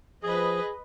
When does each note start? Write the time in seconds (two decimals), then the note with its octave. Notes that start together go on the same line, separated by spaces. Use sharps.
0.23 F3 G#4 B4 D#5